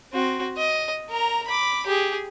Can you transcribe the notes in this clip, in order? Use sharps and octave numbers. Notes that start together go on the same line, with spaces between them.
C4 F#4
D#5
A#4 A#5
B5 D6
G4 G#4